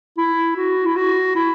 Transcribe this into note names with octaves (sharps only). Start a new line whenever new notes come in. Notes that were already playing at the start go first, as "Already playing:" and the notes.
E4
F#4
E4
F#4
E4